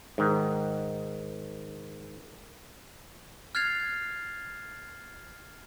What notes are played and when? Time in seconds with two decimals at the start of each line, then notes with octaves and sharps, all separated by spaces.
0.18 G#2 D#3
3.55 F6 F#6 G#6 A6 C7 F7